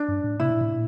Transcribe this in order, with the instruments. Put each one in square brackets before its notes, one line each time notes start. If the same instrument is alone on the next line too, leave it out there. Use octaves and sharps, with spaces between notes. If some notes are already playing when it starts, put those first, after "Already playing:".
Already playing: [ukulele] D4
[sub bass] G2
A2
[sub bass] C3 [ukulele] E4
[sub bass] A#2
A2
A#2